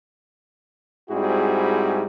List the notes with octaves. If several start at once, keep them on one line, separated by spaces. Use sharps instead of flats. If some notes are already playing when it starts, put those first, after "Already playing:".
G#2 G3 C4 E4 F#4 G#4